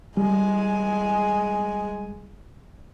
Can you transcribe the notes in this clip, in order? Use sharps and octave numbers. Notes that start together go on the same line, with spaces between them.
G3 G#3 G#5